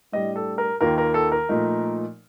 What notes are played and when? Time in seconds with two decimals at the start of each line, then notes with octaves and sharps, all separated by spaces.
0.12 A2 G3 D4 D#5
0.36 A4
0.58 A#4
0.81 D#2 D#3 A#3 F4 A#4
0.98 A#4
1.14 A4
1.32 A#4
1.49 A#2 F3 A3 D#4